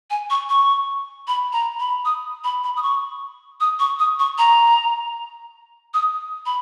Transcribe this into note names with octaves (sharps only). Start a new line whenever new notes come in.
G#5
C#6
C#6
B5
A#5
B5
D#6
B5
B5
D#6
C#6
D#6
C#6
D#6
C#6
A#5
D#6
B5